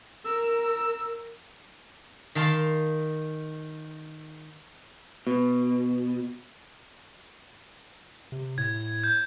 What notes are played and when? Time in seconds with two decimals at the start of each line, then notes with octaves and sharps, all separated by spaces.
0.25 A#4 E6
2.35 D#3 F5 A5 C6
5.27 B2
8.32 C3
8.58 A2 G#6
9.04 G6